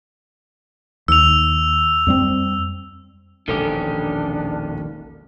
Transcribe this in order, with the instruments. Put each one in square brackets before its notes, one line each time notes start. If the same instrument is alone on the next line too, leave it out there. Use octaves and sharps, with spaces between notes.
[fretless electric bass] D#2 [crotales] E6 F7
[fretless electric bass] F2 G3 C4
[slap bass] E1 A#1 G#3 [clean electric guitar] D#3 C#4 G4 [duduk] D4 [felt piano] A4